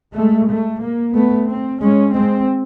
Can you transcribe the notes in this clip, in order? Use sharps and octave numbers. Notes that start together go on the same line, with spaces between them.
G#3 A3
A3
A#3
A3 B3
C4
G#3 C#4
G#3 C4